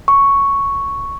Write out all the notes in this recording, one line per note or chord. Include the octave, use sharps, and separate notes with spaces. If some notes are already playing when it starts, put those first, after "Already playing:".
C#6